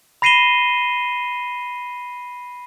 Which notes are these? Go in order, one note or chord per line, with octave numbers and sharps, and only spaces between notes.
B5 A#6 C7 D#7 E7 G7